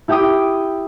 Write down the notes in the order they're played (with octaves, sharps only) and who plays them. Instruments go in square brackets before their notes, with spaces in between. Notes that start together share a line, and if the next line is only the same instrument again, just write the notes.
[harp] E4 G4 G5 D6 D#6